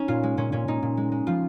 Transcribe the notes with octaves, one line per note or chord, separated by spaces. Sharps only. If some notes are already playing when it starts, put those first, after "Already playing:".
Already playing: C#4 D#4
A#2 F4
G#3
A#2 C#4
A#2 C#4
A#2 D#4
A#2
G#3
G#3
F3 F4